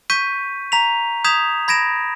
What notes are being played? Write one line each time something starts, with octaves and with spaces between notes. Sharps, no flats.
C#6 G6 B6 D#7
A#5 B6 F7
D#6 G6 G#6 B6 E7 F7
B5 G#6 A#6 D7 E7